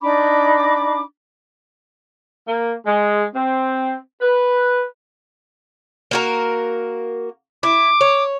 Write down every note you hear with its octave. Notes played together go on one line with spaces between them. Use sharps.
D4 D#4 B5 D6
A#3
G#3
C4
B4
A#3 F#4 A#4
E4 D6
C#5